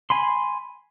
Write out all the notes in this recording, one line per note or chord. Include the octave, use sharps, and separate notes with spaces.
G#5 B5 C6